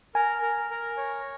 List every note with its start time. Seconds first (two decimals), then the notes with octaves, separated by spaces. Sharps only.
0.15 A#4 G#5
0.42 A#4
0.70 A#4
0.97 C#5